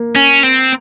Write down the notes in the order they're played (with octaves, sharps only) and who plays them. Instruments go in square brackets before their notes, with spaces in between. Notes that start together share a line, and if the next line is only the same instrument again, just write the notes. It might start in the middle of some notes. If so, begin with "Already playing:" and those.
Already playing: [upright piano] A#3
[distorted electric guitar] C#4
C4